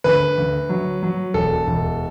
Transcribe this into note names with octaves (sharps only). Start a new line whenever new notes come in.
D2 B4
D2
F#3
F#3
E1 A4
E1